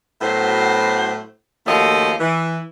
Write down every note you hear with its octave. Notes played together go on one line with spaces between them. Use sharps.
A2 F#3 B3 F#4 C5
D#2 F3 A3 C#4 F#4 D#5
E3